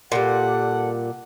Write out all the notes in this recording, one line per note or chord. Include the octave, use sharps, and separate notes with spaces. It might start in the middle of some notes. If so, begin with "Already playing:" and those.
A#2 G3 A4 F#5